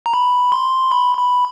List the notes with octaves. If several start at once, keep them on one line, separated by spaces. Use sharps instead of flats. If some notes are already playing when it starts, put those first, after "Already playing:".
A#5
B5
C6
B5
B5